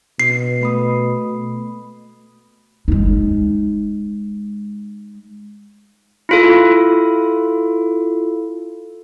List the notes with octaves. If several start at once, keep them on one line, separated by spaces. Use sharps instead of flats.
B2 C7
A3 B5 D#6
G#3 D#4
E4 F4 A4